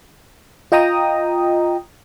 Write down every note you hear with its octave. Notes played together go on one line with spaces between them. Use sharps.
F4 D#5 G5 A#5 D#6